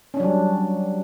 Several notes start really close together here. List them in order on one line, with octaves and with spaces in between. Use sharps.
C#4 D4 F#3 G3